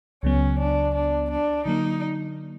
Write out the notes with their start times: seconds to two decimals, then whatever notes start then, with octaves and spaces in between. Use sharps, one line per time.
0.23 C#2 C#3 F#3 B3 C#4
0.59 D4
0.95 D4
1.30 D4
1.65 D3 F#3 A#3 D#4